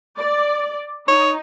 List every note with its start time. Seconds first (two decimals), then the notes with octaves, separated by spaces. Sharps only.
0.18 D5
1.08 D#4 C#5